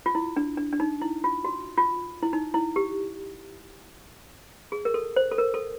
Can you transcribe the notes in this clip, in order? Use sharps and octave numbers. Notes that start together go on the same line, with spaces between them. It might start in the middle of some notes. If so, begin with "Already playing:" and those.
F4
E4
D4
D4
D4
D#4
E4
F4
F#4
F4
E4
D#4
E4
G4
G#4
A#4
A4
C5
A4
A#4
A4